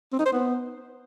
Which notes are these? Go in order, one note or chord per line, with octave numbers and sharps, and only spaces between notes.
C4
D#4
C5
B3